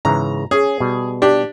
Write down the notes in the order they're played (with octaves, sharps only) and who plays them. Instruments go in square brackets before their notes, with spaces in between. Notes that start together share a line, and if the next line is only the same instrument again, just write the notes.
[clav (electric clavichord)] G#2 C#3 E3 [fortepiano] A#5
[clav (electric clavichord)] C#4 [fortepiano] G#4
[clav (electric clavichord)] B2 G3
[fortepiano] D4 G4